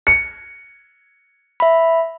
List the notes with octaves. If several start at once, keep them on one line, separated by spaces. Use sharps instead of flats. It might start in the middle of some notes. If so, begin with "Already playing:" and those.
C#7
E5 B5